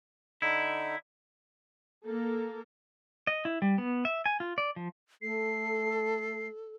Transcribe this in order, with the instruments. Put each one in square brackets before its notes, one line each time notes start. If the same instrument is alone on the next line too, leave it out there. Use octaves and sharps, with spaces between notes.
[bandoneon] D3 D#4 [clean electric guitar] E4
[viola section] A#3 A4 A#4
[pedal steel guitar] D#5
E4
G3
B3
E5
G#5
F4
D5
F3
[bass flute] A3 [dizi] A4 [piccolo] C7